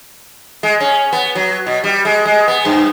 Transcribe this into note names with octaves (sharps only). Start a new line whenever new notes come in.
G#3
C#4
B3
F#3
B2
G3
G#3
G#3
B3
G2